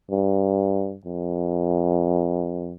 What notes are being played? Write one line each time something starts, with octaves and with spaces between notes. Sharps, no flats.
G2
F2